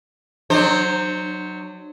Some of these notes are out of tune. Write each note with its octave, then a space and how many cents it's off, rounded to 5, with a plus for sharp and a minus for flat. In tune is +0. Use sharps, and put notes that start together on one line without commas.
F#3 +0 D4 +45 C5 +0